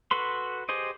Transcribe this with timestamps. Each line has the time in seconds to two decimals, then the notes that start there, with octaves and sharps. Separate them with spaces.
0.11 F#4 A4 B4 C6
0.69 G4 G#4 C5 D#5